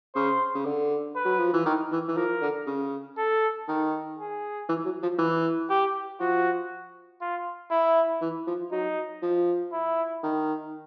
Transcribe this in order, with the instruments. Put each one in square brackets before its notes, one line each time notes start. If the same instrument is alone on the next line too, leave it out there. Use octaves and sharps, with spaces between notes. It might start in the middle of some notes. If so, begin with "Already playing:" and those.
[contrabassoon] C#3 [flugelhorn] C5
[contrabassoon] C#3
D3
[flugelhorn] B4
[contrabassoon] F#3
F3
E3
D#3
E3
E3
[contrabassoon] F3 [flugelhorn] A#4
[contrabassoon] D3
C#3
[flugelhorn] A4
[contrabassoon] D#3
[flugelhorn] G#4
[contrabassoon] E3
F#3
F3
E3
[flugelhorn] G4
[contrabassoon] F3 [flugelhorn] F#4
[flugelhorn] F4
E4
[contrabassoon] E3
F3
[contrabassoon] F#3 [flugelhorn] D#4
[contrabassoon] F3
[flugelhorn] E4
[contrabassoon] D#3